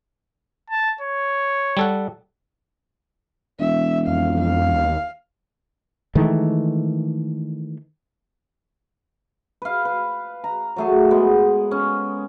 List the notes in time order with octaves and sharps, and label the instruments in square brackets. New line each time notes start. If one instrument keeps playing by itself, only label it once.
[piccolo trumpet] A5
C#5
[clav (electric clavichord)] G3 A4 F#5
[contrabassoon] E1 [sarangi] E5
[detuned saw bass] F2 [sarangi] F5
[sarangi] F5
[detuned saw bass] D#2
[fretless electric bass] D#3 E3 G#3 A3
[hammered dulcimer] B4 F5
B4
A#5
F#3 A3 G#4
G#3 B3
C#4